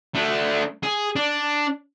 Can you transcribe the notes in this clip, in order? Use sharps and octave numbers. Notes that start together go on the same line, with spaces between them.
A3 D4
G#4
D4